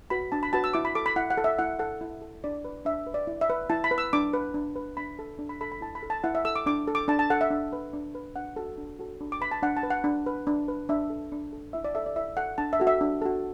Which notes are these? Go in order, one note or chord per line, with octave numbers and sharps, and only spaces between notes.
F#4 B4 B5
D4 A5
B5
F#4 B4 A5
E6
E4 D6
B5
A4 D6
B5
E4 F#5
F#5
A4
E5
E4 F#5
A4 F#5
E4
A4
D4 D5
B4
D4 E5
B4
D5
E4
E5
B4
E4 A5
B5
B4
E6
D4 D6
B4
D4
B4
D4 B5
A4
D4
B5
A4 B5
B5
E4 A5
B5
A4
A5
E4 F#5
E5
A4 E6
D6
D4 D6
A4
D6
D4 A5
A5
A4 F#5
E5
D4
B4
D4
B4
D4 F#5
F#4 A4
D4
F#4 A4
D4
D6
B4 B5
A5
D4 F#5
A5
B4
F#5
D4
B4
D4
B4
D4 E5
A4
D4
A4
E4 E5
D5
A4 E5
D5
E4 E5
A4 F#5
D4 A5
E5
F#4 A4
E5
D4
F#4 A4